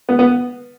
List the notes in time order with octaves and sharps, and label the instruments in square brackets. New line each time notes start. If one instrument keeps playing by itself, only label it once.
[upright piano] B3
B3